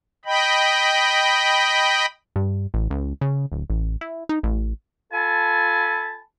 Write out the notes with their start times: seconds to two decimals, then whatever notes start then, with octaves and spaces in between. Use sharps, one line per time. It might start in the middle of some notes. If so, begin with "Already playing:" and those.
0.25 D#5 G5 B5
2.36 G2
2.74 A1
2.90 C#2
3.21 C#3
3.52 D1
3.70 A1
4.01 E4
4.29 D#4
4.43 A1
5.13 F4 A4 G#5 A5 B5